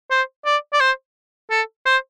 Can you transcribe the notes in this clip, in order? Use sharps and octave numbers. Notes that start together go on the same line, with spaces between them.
C5
D5
D5
C5
A4
C5